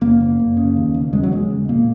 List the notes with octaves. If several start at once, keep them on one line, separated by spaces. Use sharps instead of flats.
F#1 A#3
F#1
F#1
C#3
D#2
E1
C#3 G#3
F#3
C#3 G#3
E1
A#2 A#3